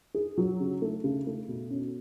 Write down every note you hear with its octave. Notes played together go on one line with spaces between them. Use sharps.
G#4
F#3
C#3
A3
C#3
A3
B2
C#4